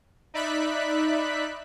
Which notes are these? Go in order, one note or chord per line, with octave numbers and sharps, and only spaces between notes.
D#4 D5 E5 B5 F#6 B6